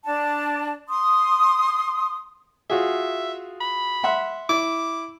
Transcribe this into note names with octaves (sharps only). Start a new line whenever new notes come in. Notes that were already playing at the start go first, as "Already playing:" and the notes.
D4 A5
C6 D#6
F4 F#4 G#4 E5
B5
E5 F#5 C6
E4 D6